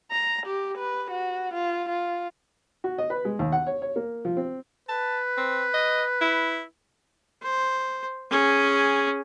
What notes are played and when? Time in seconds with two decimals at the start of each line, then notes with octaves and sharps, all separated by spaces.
0.11 A#5
0.46 G4
0.77 B4
1.10 F#4
1.54 F4
1.89 F4
2.84 F#4
2.98 D#5
3.10 B4
3.25 G#3
3.39 D#2
3.52 F#5
3.67 C#5
3.82 C#5
3.96 A#3
4.25 F3
4.37 C4
4.89 B4 A5
5.37 C4
5.74 D#5
6.22 E4
7.43 C5
8.31 C#4 G#4